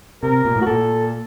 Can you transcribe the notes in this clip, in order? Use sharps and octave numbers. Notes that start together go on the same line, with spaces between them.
C3 A#4
A#2
A2
F#4
A#2 A4